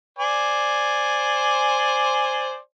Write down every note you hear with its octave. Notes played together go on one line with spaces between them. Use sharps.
C5 D5 G#5